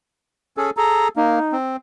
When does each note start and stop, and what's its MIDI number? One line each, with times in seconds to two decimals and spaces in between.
0.57 0.70 61
0.57 0.70 68
0.57 0.70 69
0.77 1.08 68
0.77 1.08 69
0.77 1.08 82
1.16 1.39 58
1.16 1.55 63
1.52 1.76 60